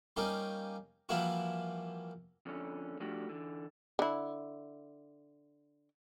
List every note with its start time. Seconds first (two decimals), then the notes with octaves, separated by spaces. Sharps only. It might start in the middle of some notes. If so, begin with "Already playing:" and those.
0.16 G3 A#3 C#4 D#4 G4
1.09 E3 F3 G3 A#3 E4 F#4
2.46 F2 D3 C#4
3.00 F3 A3 D4 F#4 G4
3.29 D3 E3
3.99 D3 E4